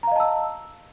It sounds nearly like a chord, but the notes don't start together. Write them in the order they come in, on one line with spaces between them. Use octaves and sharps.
A#5 F5 D#5 A5 E6